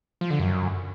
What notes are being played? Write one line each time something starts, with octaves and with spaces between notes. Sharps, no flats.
F3
D3
F#2